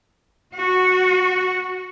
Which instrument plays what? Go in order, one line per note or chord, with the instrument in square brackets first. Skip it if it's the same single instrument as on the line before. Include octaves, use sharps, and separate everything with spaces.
[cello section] F#4